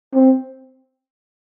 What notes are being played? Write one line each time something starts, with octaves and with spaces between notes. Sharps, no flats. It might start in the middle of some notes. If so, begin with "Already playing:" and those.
C4